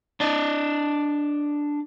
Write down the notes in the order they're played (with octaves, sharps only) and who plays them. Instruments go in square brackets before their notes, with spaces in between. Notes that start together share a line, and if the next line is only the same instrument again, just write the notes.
[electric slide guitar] D4 D5 D#5